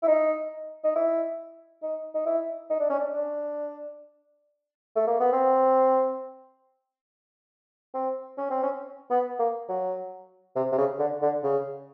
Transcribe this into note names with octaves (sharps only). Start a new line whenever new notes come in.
E4
D#4
D#4
E4
D#4
D#4
E4
D#4
D4
C#4
D4
D4
A3
A#3
B3
C4
C4
C#4
C4
C#4
B3
A#3
F#3
C3
C3
C#3
D3
D3
C#3